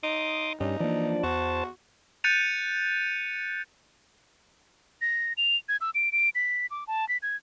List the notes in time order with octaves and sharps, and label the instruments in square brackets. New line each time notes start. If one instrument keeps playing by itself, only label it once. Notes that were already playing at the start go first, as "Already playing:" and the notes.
[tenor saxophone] D#4 [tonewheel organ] C6 D6 D#6
[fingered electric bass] G2 [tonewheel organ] G3 C#4 [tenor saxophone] D#4
[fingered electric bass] E3 A#3 [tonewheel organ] F3 D4 D5
[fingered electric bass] E2 [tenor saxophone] F#4 [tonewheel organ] C5 A5
[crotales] F#6 G6 A6 C#7 D#7 F7
[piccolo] A#6
F7
G#6
E6
D7
D7
B6
D6
A5
B6
G#6